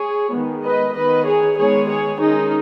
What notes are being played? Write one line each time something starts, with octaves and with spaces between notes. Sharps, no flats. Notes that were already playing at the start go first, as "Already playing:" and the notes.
Already playing: G#4 C#5
D#3 G#3 B3
B4 D#5
D#3 B3 B4 D#5
G#4 C#5
D#3 G#3 B3 G#4 C#5
G#4 C#5
D#3 G#3 C#4 D#4 G#4